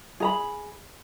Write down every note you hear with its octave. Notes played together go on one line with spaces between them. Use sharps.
G#4 A#5 B5